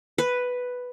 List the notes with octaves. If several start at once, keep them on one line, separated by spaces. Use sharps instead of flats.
B4